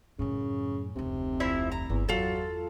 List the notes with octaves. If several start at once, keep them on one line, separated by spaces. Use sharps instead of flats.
F#2 A2 C#3
F1 D2 C3
F3 E4 E5
A#5
G1 E2
E2 F#3 F4 A4